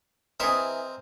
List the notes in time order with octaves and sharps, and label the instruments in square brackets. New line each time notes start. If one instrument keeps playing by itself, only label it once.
[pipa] E3 G#4 [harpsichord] C4 A#4 D#5